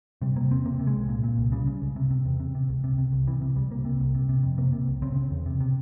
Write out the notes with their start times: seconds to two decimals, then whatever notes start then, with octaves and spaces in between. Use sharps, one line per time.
0.22 C3 G3
0.36 C3 A#3
0.50 E2 C4
0.65 C3 A#3
0.79 C3
0.87 G#3
0.95 C2
1.09 A#2
1.23 A#2
1.38 C2
1.52 C#3 G3
1.67 C#3
1.82 C#2
1.96 C3
2.11 C3
2.25 E2
2.40 C3
2.55 C3
2.69 C#2
2.84 C3
2.98 C3
3.13 C2
3.27 C3 E3
3.41 C3
3.56 C#2 G3
3.71 C3 A#3
3.85 C3
4.00 C2
4.15 C3
4.29 C3
4.43 F2
4.58 C3 A#3
4.73 C3
4.88 C2
5.02 C#3 C4
5.16 C#3
5.31 E2
5.46 C3
5.61 C3